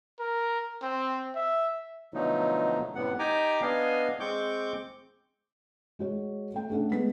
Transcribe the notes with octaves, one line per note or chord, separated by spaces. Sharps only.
A#4
C4
E5
B2 D3 F3 F#3 A3 D#4
F#2 A2 C3 G3 B3 F#5
D#4 G4 G5 G#5 A#5 D6
B3 D4 D#5 F5 G#5
G#3 C4 C#6 D6 G6
G#3 F#4 C#5
A3 G5
A3 C#4 D4 A4 F#5
G#3 B3 B6